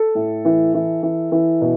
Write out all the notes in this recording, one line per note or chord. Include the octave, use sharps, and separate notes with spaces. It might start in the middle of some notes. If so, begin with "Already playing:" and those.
Already playing: A4
A2
E3
E3
E3
E3
B2